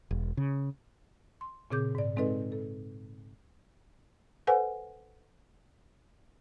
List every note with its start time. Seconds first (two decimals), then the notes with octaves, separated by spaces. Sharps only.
0.11 E1
0.37 C#3
1.41 C6
1.70 A#2 C#3 C4 G#4 D6 G6
1.95 G#2 D5
2.16 G#3 C4 D#4 A4 B4 D#5
2.52 A4
4.47 A4 B4 C5 F#5 G#5